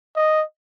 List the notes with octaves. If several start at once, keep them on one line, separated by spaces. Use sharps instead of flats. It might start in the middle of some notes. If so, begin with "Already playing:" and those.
D#5